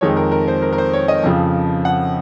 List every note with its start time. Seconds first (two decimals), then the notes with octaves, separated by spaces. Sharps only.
0.01 F2 D#3 G#3 C#5
0.17 A#4
0.32 A#4
0.48 C5
0.62 A#4
0.73 A#4
0.78 C5
0.93 C#5
1.08 D#5
1.23 F2 C#3 F3
1.85 F#5